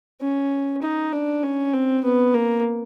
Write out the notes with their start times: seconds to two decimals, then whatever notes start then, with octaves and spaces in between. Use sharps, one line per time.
0.21 C#4
0.83 D#4
1.13 D4
1.43 C#4
1.74 C4
2.05 B3
2.34 A#3